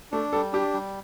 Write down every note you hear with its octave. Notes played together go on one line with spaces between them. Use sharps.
A3 D4
G3 A4
D4 G4
G3